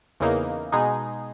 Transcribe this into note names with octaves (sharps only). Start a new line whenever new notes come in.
E2 C#3 E3 A#3 D#4
B2 G#3 D#4 G#4